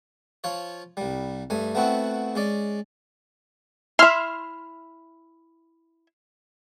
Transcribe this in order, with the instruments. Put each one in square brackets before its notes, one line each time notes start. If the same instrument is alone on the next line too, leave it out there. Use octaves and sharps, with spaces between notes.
[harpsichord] F3 F4 C#5
C2 G3
G2 A3 G#5
A3 B3 C4 E4 F#4
G#3 C#4 D5
[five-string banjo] E4 E5 [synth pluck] C6 F6